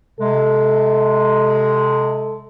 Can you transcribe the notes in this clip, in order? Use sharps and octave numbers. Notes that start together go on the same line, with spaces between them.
C3 G#3 A4